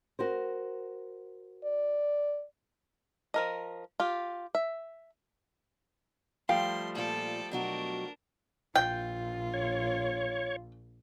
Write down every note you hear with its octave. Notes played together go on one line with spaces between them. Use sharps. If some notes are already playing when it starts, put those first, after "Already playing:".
F#4 A#4 C5
D5
F3 A#4 D#5
F4 G4
E5
F3 G3 A3 F5 G5 C6
A#2 F4 A4 D5
B2 F#3 D4 F#4 A#4
A#1 F4 G5
C#5